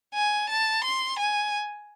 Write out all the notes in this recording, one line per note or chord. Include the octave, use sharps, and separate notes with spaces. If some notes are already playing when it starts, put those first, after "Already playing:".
G#5
A5
C6
G#5